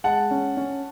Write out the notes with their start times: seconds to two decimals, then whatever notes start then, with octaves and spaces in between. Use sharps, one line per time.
0.04 G#3 F#5 A5
0.31 C#4
0.57 C#4